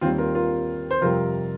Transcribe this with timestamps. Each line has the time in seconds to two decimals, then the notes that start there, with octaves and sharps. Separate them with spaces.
0.01 D#2 D#3 G3 C4 F4
0.18 F4 A#4
0.35 F4 A#4
0.91 C5
1.01 F2 C3 G3 F4 A#4